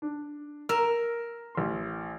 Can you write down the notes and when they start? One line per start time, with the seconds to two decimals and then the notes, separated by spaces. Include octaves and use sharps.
0.02 D4
0.69 A#4 E6 E7
1.55 A1 C6